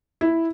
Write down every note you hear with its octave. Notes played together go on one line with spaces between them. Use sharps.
E4